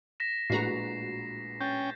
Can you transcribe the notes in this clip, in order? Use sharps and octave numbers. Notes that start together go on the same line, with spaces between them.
A#6 B6 E7
A#1 A2 G#3 F#4 B4 A#5 C7
C#4 G5 G6 A6